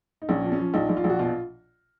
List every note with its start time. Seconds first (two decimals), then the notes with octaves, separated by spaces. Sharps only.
0.22 D#4
0.29 A#1 C#4
0.44 F3
0.52 C#4
0.59 F3
0.74 A#1 D#4
0.89 A#1
0.97 F4
1.04 A#1
1.09 F#4
1.19 B2 F4